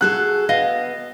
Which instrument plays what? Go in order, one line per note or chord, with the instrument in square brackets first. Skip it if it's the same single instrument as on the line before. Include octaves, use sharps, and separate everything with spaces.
[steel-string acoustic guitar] F#4 G#4 A4 [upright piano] F#6
[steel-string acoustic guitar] B3 [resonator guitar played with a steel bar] D#5 F5